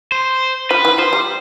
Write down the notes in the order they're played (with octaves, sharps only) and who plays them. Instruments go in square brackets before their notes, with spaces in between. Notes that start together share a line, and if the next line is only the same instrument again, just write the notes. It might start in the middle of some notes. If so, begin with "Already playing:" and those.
[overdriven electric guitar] C5
[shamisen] F3 [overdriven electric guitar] B4
[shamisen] E3
[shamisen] F3 [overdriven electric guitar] C5
[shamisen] G3